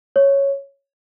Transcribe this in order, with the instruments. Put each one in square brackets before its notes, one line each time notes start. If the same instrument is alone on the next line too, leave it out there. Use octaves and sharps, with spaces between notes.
[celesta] C#5